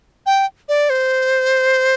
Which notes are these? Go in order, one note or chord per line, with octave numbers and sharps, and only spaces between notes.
G5
D5
C5